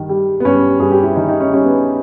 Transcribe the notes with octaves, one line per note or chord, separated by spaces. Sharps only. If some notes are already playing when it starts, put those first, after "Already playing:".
Already playing: G2 D#3
G3
B3
G2 C#4
G2 G#4
G4
E4
D#3 D#4
D#4
C#4
G3 C#4
B3